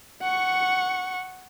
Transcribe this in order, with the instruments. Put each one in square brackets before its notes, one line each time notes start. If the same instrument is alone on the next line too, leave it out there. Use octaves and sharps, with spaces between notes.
[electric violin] F#5 C#6